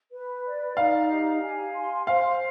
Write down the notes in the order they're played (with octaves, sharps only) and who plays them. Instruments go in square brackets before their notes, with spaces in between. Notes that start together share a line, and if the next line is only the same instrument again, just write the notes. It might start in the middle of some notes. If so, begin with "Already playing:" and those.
[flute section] B4
D5
[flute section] D#4 [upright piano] F5
[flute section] G4
G#5
C6
[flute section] C5 [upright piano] F5